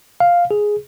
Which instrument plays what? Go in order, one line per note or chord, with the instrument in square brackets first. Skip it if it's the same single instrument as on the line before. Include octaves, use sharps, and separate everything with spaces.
[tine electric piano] F5
G#4